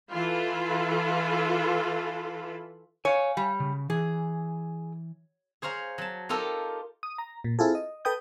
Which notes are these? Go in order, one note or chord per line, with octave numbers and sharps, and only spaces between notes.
E3 F4 A4 B5
C#5 F5 G#5
G3
C#3
E3 G#4
G#4 C5 C#5 F5 A#5
F#3 A5
D#4 F4 G4 A4 A#4
D#6
A#5
A#2
C4 E4 F4 G#4 A4
D#5
A4 B4 G5 D#6 G6